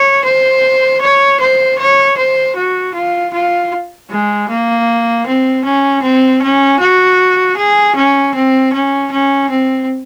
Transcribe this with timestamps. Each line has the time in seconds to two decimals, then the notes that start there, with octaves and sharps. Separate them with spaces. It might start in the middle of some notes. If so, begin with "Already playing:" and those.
Already playing: C#5
0.24 C5
1.01 C#5
1.40 C5
1.78 C#5
2.17 C5
2.56 F#4
2.94 F4
3.33 F4
4.11 G#3
4.49 A#3
5.26 C4
5.64 C#4
6.03 C4
6.42 C#4
6.80 F#4
7.57 G#4
7.96 C#4
8.35 C4
8.73 C#4
9.12 C#4
9.50 C4